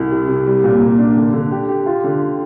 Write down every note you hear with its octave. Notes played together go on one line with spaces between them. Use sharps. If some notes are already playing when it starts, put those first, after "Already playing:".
Already playing: C2
C3
C3
G3
A#2
A#3
D4
D3
D3
G4
G4
F4
D3